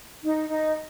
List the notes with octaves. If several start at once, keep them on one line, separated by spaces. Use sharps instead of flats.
D#4
D#4